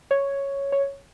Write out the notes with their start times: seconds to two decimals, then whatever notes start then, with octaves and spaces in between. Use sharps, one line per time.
0.11 C#5
0.72 C#5